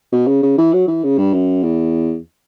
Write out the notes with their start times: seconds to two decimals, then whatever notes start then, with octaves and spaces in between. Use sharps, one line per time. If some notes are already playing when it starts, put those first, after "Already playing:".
0.12 B2
0.27 C#3
0.43 C#3
0.58 E3
0.73 F#3
0.87 E3
1.04 C#3
1.18 G2
1.33 F#2
1.63 E2